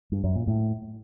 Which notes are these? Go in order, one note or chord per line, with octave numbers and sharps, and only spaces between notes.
G2
F#2
A#2
A2